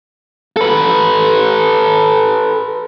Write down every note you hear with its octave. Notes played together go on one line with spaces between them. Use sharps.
A4 B4